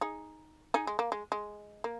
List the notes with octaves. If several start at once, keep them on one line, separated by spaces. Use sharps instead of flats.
D#4 G#4
D#4 G#4
G#3
A#3
G#3
G#3
A#3